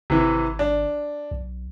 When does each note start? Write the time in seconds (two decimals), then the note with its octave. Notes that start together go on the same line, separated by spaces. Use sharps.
0.10 G#1 C3 E3
0.59 D4
1.31 B1